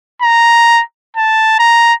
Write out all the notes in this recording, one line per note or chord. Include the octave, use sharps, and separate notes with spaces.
A#5
A5
A#5